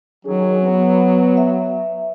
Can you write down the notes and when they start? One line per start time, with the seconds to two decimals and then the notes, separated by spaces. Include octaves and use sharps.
0.25 D#3 F#3 C#4 G#4
0.62 B3
1.37 E5